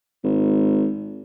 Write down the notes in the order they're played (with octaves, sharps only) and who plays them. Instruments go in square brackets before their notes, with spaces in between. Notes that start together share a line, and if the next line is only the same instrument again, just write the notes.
[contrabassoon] G#1